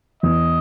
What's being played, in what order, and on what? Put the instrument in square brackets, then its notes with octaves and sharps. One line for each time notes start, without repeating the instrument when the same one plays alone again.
[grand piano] E2 [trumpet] D#5